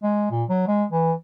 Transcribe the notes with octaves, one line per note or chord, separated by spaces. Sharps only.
G#3
A#2
F#3
G#3
E3